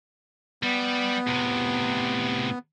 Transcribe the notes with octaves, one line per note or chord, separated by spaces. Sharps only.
G3 B3
A2 C3